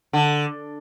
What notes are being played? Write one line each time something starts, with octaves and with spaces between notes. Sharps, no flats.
D3